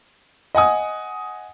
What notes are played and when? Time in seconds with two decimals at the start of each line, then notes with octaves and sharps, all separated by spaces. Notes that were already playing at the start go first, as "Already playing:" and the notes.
0.55 D#5 F#5 G#5 D#6